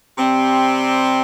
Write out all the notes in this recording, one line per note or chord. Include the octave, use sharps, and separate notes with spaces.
C3 G3 C4